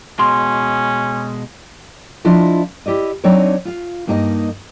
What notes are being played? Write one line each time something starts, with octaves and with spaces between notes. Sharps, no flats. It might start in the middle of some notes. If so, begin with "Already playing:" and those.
B2 G#3 C#4 C6
F3 D4 E4 F4 D#5
E4 G4 D5 D#5
F#3 C4 D4 D#4 C#5 D5
F4 F5
G2 A#3 D#4 G#4 D#5